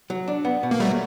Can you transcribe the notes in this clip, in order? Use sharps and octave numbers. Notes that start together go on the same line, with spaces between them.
F#3
D4
B3
B2
A#3
F#3 G3 A3